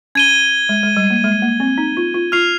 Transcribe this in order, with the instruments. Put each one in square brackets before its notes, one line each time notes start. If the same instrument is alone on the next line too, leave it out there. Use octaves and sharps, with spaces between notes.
[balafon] C#4 [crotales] G#6 D#7 G7
[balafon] G#3
G#3
G3
A#3
G#3
A#3
C4
D#4
F4
F4
[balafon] F4 [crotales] F6 C7 F7